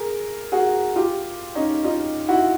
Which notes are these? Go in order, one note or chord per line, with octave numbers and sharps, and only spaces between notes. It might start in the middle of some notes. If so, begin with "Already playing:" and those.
Already playing: G#4 A#4
F#4 G#4
F4 G4
C#4 D#4
D#4 F4
E4 F#4